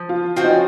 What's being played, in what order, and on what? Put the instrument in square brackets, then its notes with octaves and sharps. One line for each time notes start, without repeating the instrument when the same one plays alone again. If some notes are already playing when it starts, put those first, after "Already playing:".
Already playing: [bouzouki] F3
[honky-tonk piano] F4
[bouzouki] F3 C4 F#4 [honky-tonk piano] F4
[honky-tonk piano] D#4
C#4